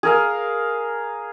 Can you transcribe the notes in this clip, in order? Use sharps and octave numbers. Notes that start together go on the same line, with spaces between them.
G#4 A#4 F5